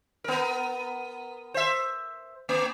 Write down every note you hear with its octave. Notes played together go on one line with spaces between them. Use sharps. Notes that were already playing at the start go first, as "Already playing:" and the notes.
B3 A#4
C5 E5
A#3